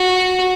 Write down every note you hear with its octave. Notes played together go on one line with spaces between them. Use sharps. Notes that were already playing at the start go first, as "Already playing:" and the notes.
Already playing: F#4